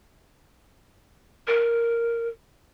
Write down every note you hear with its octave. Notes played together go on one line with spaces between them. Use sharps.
A#4